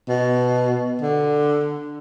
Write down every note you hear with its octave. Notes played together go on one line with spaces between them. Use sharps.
B2
D3